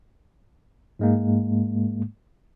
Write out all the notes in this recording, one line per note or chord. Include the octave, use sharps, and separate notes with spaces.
G#2 G#3 A#3